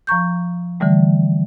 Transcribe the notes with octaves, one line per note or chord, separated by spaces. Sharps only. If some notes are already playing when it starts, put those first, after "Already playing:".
F3 A#5 C#6 G6
D3 E3 G3 A3